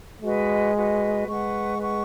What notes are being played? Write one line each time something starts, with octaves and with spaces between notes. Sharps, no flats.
G#3 F#4 B4 D#5
F#4 B4 D#5
G#3 B4 F#5 C#6
B4 F#5 C#6